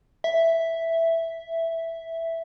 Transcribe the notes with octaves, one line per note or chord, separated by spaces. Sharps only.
E5